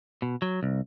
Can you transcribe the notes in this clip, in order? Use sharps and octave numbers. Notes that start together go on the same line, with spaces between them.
B2
F#3
C2